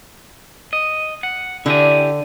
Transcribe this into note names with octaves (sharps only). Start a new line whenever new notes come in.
D#5
F#5
D3 E4 G4 G#5